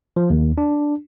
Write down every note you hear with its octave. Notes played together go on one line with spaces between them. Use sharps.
F3
D#2
D4